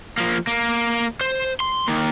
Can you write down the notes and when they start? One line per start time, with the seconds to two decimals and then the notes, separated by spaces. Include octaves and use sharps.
0.18 F3 A#3
0.47 A#3
1.21 C5
1.60 C6
1.88 D#3 A#3